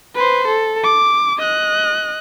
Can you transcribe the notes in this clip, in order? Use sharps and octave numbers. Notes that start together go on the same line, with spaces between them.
B4 C5
A4
D6
D#5 F#6